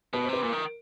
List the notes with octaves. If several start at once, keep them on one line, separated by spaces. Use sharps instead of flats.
B2 B4
C5
C3 B4
A#2 A#4
D#3